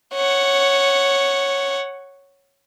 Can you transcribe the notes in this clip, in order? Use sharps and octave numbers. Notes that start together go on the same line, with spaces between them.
C#5 F#5